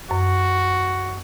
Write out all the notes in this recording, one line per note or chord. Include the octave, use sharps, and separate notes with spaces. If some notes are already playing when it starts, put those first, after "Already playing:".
F#2 F#4